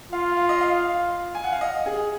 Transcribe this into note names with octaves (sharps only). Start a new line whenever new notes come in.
F4 F5
F5
D#5
F5
G#5
F#5
F5
D#5
G#4